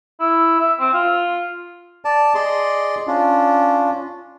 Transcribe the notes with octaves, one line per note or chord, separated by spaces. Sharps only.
E4
E5
C4
F4
D5 A5
G#4 D5 D#5 C6
C#4 D4 F4